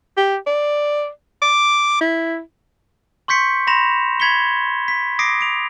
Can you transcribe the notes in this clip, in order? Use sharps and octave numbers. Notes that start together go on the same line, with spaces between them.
G4
D5
D6
E4
C6 C#6 G6 B6 C#7
B5 C6 A#6 E7 F7
B5 G#6 B6 C#7 G7
B6
D6 D#6 A#6 C7 D7
D7 F7